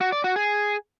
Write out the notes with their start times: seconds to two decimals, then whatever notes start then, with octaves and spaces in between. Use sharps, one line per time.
0.01 F#4
0.12 D5
0.24 F#4
0.36 G#4